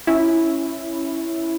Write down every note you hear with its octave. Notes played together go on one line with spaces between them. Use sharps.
C#4 E4